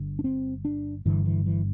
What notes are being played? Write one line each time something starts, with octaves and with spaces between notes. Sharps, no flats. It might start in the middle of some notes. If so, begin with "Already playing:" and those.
Already playing: G1 G2 D3
D4
C4
D4
G1 G2 D3 E3
E3
E3